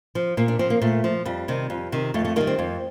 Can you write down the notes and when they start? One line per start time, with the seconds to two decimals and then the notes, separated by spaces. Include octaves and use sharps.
0.15 F3
0.37 A#2 A#3
0.48 D4
0.59 F3 C4
0.70 A#3
0.82 A#2 A3
1.04 F3
1.25 F2 G3
1.48 C3 D#3
1.70 F2
1.92 C3 D#3
2.14 F2 A3
2.25 A3
2.36 D#3 A#3
2.41 G3
2.47 C4
2.59 F2